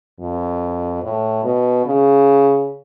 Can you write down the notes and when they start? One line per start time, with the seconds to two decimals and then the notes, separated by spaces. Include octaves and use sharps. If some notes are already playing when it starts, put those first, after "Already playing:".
0.20 F2
1.04 A2
1.44 B2
1.86 C#3